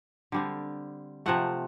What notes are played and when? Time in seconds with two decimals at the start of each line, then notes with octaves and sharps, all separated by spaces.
0.32 D3 G3 C4
1.26 C3 F3 A3 F#5